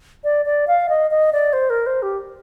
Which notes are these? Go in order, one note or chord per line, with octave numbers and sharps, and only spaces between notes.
D5
D5
F5
D#5
D#5
D5
C5
A#4
C5
G4